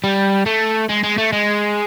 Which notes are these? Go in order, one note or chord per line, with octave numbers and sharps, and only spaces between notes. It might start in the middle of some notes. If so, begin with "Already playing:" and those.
G3
A3
G#3
G#3
A3
G#3